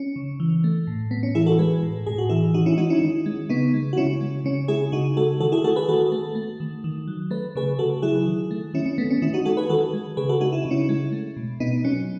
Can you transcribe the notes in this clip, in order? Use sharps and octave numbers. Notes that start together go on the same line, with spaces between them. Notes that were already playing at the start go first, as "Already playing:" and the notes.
Already playing: C#4
C#3
E3
A3
A2
A2 B3
C#4
E3 E4 G#4
F#4 A4
G#3 G#4 B4
A2
A2 G#4
F#4
E3 E4 G#4
D#3 D#4 F#4
C#4 E4
G#3 D#4 F#4
C#4 E4
D#3
G#3
C#3 B3 D#4
G#3
F#4
C#3 C#4 E4
G#3
C#3 C#4
G#3 E4 G#4
C#3 D#4 F#4
G#3 F#4 A4
D#3 F#4 A4
E4 G#4
A3 F#4 A4
G#4 B4
D#3 F#4 A4
A3
A3
D#3
D#3
F#3
A3 B4
C#3 G#4 B4
C#3 F#4 A4
F#3 E4 G#4
D#3
A3
D#3 C#4 E4
C#4
A3 B3
C#4
D#3 C#4 E4
D#4 F#4
G#3 F#4 A4
G#4 B4
D#3 F#4 A4
G#3
C#3 G#4 B4
F#4 A4
G#3 D#4 F#4
E4
C#3 D#4
C#4 E4
G#3
A3
B2
B2 B3 D#4
F#3 C#4